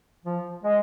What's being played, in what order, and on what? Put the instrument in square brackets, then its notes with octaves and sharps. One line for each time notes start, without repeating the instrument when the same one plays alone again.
[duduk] F3
G#3